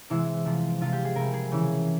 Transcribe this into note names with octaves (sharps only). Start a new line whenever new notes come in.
C3 E3 G#3 E4
C3 F3 G#3
C3 F3 G#3 F4
G4
G#4
C3 G3 A#4
G#4
C#3 E3